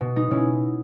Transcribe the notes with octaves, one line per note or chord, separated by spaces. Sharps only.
B2
B3 D#4
B2 C#4 E4